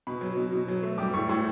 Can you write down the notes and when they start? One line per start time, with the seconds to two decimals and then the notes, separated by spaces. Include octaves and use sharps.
0.07 B2 B5
0.21 F#3
0.37 B2
0.52 B2
0.68 F#3
0.83 A3
0.98 G3 D6
1.14 A2 C#6
1.29 A2 C#6